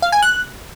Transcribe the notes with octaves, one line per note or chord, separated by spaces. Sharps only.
F5
G#5
F#6